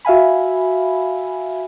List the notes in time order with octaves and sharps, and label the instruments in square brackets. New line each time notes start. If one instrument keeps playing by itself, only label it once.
[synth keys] F#4 E5 F5 G#5 B5